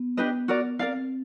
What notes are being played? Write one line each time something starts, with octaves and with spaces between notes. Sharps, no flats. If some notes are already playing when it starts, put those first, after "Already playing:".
Already playing: B3
D4 G4 B4 D#5
F#4 A#4 D5
C4 A#4 D5 F5